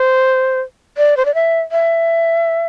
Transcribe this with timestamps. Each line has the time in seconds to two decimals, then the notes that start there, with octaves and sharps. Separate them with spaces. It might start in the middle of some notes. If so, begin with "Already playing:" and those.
Already playing: C5
0.98 D5
1.17 C5
1.25 D5
1.34 E5
1.72 E5